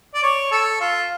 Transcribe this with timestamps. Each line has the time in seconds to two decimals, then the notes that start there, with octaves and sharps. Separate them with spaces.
0.15 D5
0.23 C#5
0.51 A4
0.81 F4